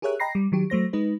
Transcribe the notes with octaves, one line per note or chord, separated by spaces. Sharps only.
G4 G#4 A#4 C#5 E5 F#6
D#5 G5 A#5 B5 A#6 C7
G3
D#3 F#3 G4
F#3 A3 C5 A#6
G#3 D#4 B4